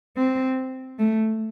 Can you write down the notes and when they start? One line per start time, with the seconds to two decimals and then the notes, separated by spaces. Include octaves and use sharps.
0.17 C4
0.99 A3